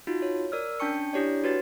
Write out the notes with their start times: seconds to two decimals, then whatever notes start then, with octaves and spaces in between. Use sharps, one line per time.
0.07 D#4 F4 F#4
0.22 C#5
0.52 A#4 D5 E6 F6
0.80 C#4 D4 G5 A5 C#6 C#7
1.13 D4 E4 G4 C#5 D5
1.44 F#4 B4 C#5 A6